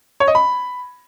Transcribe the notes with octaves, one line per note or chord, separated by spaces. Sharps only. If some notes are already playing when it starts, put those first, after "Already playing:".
C#5
D#5
B5